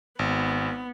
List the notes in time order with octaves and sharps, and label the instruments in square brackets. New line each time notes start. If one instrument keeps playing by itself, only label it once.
[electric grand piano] G#1 [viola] B3